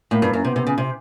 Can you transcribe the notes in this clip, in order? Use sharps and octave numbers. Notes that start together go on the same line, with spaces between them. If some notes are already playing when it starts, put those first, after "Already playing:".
A2 A#3
G2
F#2
C3 B3
C3
C#3
C3